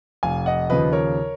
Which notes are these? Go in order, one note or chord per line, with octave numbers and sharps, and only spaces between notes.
F1 F5 G#5
D#5 F#5
D#2 C#3 F3 B4 D#5
A#4 C#5